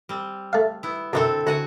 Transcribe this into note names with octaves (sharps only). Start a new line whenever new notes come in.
G3 C4
A3 F5
B3 E4
F#2 B2 D3 C4 A4
D2 F#4 F#5 G#5